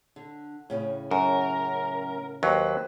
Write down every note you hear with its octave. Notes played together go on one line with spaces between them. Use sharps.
D3
A2 C#3 C#4
F#2 A#4
D#2 F#3 B4 C5